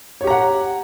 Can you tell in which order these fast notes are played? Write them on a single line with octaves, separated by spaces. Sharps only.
C#5 G4 A#5 F#5